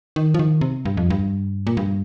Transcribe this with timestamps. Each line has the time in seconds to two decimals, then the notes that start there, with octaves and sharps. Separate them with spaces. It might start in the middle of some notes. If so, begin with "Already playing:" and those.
0.16 D#3
0.34 F3
0.39 D#3
0.61 C3
0.85 G2
0.97 F2
1.10 G2
1.67 A#2
1.77 G2